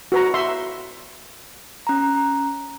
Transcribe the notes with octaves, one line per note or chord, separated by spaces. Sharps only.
F#4 B4 A#5
E5 C6
C#4 A#5